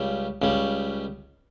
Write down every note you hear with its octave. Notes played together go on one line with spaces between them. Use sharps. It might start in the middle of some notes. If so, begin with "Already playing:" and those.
Already playing: C#2 C#3 G3
C#2 C#3 G3